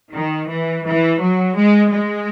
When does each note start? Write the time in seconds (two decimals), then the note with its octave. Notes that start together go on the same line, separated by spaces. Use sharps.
0.13 D#3
0.48 E3
0.84 E3
1.21 F#3
1.56 G#3
1.92 G#3